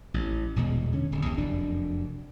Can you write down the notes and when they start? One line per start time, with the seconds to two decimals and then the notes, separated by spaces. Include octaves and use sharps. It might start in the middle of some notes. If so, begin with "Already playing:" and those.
0.14 A1
0.56 D#1 E2 B2 G#3
0.93 D3 C#4
1.12 D1
1.25 D#2
1.38 F1 F#2 D4